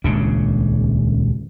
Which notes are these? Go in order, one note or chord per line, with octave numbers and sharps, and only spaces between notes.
D#1 C#2 C#3 D4